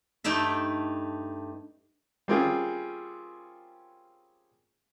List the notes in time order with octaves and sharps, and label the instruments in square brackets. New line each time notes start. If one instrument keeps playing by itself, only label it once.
[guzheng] G2 A3 D#4 D5 E5
[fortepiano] G3 A#3 C4 C#4 F4 G#4